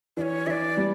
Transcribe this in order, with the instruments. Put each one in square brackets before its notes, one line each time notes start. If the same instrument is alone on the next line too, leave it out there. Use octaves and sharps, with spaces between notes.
[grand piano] E3 [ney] D5
[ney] C#5
[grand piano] E3 [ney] D5 E5
[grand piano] G3 [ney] D5